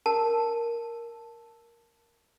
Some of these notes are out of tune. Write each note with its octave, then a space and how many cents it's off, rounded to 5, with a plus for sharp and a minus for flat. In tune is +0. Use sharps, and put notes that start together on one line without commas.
A#4 +0 A5 +0